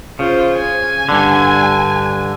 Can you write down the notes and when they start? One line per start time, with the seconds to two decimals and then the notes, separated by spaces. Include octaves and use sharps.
0.19 C#3 F4 C5
0.55 G#5
1.09 G2 D3